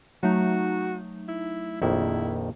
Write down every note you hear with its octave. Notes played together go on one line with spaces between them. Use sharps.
F#3 A3 D#4 F#4
E4
A#1 F2 D#3 E4